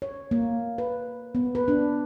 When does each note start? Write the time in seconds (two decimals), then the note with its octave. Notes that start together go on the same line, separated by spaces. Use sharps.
0.02 C#5
0.31 A#3
0.78 B4
1.35 B3
1.55 B4
1.68 D4